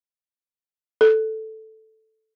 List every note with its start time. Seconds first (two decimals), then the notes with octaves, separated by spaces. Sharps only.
1.01 A4